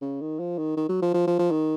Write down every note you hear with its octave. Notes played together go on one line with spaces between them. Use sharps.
C#3
D#3
F3
D#3
D#3
F#3
F3
F3
F3
F3
D#3